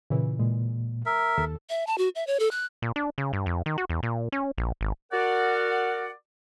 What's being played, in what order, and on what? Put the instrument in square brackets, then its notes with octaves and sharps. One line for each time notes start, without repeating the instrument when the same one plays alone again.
[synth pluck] A#2 C#3 E3
[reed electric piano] A#2 [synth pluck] G#3
[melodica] A#4 E5
[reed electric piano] D#2 [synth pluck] A4
[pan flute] E5
A5
F#4
E5
C#5
A4
F#6
[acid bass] A#2
D4
C#3
G2
F2
D#3
F#4
E2
A#2
C#4
A#1
G#1
[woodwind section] F#4 A#4 D5 F#5